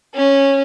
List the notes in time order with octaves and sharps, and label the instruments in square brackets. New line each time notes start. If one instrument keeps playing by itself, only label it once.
[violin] C#4